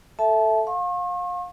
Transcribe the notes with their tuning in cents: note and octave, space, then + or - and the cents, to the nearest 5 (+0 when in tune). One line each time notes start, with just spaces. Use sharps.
A4 +0 E5 +0 A5 -25
F5 +30 C#6 -45